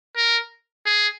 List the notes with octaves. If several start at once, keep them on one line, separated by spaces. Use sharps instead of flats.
A#4
G#4